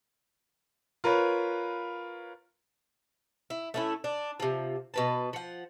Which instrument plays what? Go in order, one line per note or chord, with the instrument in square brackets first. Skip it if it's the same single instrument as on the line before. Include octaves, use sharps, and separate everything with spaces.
[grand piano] F4 A#4 B4 C#5
[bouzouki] E4
A3 C#4 E4
D4
C3 F3
B2 B4 A5
F3 F#5